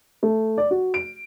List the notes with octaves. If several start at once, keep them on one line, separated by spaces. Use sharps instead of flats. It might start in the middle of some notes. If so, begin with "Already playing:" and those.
A3
D5
F#4
D7